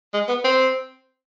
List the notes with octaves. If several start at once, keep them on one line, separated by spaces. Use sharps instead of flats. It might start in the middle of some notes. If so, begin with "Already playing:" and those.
G#3
B3
C4